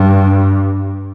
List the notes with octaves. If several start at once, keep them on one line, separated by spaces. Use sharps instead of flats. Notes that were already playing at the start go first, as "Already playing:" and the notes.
Already playing: G2